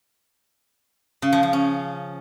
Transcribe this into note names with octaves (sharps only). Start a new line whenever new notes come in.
C#3
F3
F3
C#4